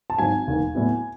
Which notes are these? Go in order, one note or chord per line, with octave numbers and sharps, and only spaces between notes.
A5
G#1 G#2 F#3 G#5
E1 D#2 D#3
A2 F#3 B3 E4